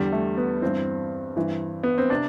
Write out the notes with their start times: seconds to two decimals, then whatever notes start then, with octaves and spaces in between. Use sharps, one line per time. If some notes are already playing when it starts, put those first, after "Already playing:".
Already playing: E2 D3 G3
0.12 A3
0.37 B3
0.62 G2 E3 C4
1.36 G2 E3
1.83 B3
1.98 C4
2.10 C3 D4